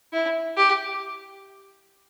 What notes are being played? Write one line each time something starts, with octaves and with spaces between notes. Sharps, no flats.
E4
G4